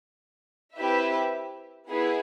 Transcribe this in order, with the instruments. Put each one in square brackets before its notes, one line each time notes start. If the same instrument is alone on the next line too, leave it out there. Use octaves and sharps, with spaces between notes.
[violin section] C4 E4 G4 B4 E5
B3 E4 G#4 B4